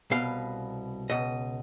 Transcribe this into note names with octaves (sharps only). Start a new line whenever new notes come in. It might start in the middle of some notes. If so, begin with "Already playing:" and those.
C2 B2 F5
C#2 B2 D#5